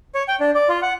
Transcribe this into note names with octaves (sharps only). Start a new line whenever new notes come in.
C#5
G5
D4
D5
F4
F#5